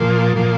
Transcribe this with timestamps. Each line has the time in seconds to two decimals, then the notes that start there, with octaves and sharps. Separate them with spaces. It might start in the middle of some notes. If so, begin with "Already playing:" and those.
Already playing: A#2 F3
0.36 A#2 F3